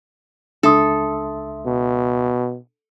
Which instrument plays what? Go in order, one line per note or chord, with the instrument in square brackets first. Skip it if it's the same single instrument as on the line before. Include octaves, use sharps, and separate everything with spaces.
[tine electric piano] C#2 E5 C6 [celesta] D4 D#6 [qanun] A4
[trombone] B2